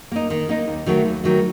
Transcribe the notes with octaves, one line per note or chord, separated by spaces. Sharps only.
A#3 D#4
D#3
A#3 D#4
D#2
D#3 F#3 A3
D#2
D#3 F#3 A3